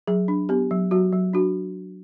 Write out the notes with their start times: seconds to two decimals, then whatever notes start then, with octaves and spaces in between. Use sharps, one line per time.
0.07 F#3 G#4
0.28 D4
0.49 B3 G4
0.71 F#3
0.91 F#3 F#4
1.13 F#3
1.33 D4 F#4